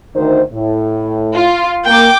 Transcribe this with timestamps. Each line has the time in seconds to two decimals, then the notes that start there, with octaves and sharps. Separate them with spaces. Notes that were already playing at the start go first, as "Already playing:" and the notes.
0.16 D2 D#3 C5
0.53 A2
1.34 F4
1.87 A#3 G5 D6